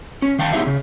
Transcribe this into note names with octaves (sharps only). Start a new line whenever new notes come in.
C#4
D#3 F5 G5 A5
B3 D#4 E4 G4 G#4 E5
C#3